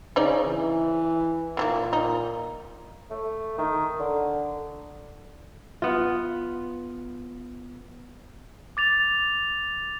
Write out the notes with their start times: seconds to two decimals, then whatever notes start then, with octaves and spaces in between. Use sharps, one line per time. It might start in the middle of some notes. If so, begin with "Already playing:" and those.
0.16 C#3 C4 D#4 D5
0.46 E3
1.57 A#2 D#3 F3 A#3
1.93 D#4
3.10 A3
3.58 D#3
4.00 D3
5.82 B3 F4
8.77 D6 A6 F7